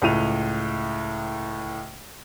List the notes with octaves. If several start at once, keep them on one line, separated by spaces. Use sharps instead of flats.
C#2 A2 D#7 F7